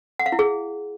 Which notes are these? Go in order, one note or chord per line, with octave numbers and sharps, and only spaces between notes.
F#5
F5
E4
G#4